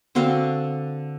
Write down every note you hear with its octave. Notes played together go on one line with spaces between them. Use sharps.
D3 C4 F#4 F5